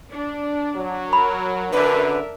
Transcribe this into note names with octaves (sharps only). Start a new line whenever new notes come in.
D4
F#3
A#4 B5
F#2 D3 D4 A#4 B4 E5